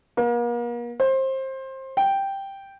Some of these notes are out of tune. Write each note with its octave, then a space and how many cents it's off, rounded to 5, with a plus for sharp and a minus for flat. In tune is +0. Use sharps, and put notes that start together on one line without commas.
A#3 +40
C5 +25
G5 +0